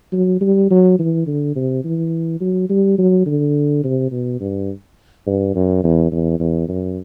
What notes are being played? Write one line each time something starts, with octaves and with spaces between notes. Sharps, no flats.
F#3
G3
F#3
E3
D3
C3
E3
F#3
G3
F#3
D3
C3
B2
G2
G2
F#2
E2
E2
E2
F#2